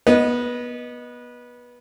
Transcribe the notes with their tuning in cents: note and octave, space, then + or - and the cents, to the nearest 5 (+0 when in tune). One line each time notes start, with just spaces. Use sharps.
B3 -20 D#5 -5